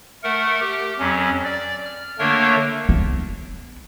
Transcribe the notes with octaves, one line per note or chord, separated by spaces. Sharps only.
A3 A#4 F#5
G4
F2 F#3 C#4
D5
F6
D3 A3 A#3 D4 A#4 C#5
B3